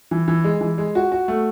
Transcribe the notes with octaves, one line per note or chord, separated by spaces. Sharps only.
E3
E3
G#3
E3
G#3
F#4
F#4
A3